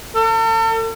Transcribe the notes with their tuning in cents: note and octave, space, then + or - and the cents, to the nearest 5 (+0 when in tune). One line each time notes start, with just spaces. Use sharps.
A4 +40